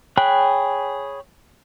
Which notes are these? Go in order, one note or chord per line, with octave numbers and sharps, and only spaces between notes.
G#4 C#5 G5 B5 F#6